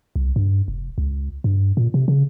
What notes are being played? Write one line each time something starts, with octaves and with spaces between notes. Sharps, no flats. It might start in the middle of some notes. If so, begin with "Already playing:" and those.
C2
G2
F1
C#2
G2
A#2
C3
C#3